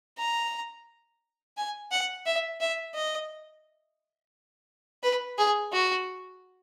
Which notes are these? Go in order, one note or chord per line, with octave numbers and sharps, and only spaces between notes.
A#5
G#5
F#5
E5
E5
D#5
B4
G#4
F#4